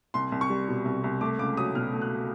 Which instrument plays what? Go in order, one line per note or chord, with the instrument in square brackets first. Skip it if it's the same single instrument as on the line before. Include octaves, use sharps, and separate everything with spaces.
[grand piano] C2 C6
C2
C#6
G3
B2
C2
C2
A3 D6
C#2 D6
F#3 D#6
B2 F6
A3
F#6